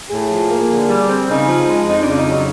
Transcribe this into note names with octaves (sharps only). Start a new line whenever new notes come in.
A2 G#4
F3
A#3
D3
G3
C4
C#3 D#4
F3
G#3
F2 D#4
D4
C#3
D#4
F#3 D#4